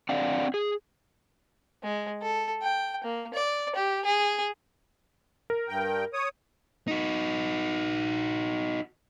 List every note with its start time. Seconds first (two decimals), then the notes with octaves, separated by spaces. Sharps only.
0.09 C4 D4 D5 F5 F#5
0.54 G#4
1.83 G#3
2.22 A4
2.62 G5
3.03 A#3
3.34 D5
3.76 G4
4.05 G#4
5.50 A#4
5.68 G2 G5
6.13 C#5 D#6
6.88 D#4 F#4